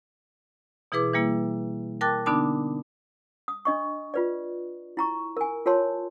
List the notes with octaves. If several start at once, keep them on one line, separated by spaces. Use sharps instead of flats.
B2 E3 E4 G#4 B4 D6
E3 G3 A#3 E4
A#4 G5 A5 D6 F#6 A6
D3 B3 D4 D#4 A5 D6
D#6
D4 D#5 C#6
F4 B4 D5
E4 A#5 C#6
A#4 G#5
F4 A#4 C#5 A5 C6